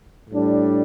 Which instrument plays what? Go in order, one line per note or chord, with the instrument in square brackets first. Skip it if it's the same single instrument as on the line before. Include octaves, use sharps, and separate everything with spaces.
[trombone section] A2 G3 D4